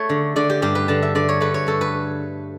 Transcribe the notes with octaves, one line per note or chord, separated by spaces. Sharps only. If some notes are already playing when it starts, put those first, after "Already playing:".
Already playing: A3 C#5
D3
D3 D5
G4
G2 G4
B4
D3 A5
E5
D3 D5
C#5
A3 B4
C#5
G2 A4
B4